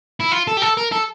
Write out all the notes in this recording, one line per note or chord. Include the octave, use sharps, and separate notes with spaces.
E4
F4
A4
G4
A4
A#4
A4